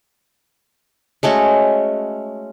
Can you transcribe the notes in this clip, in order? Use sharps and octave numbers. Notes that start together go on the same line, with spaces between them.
G#3 A3 C#4 F#4